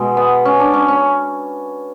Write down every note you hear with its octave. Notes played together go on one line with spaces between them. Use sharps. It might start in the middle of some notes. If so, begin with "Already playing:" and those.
Already playing: B2 G#3
B3
C#4
D4
C#4
C#4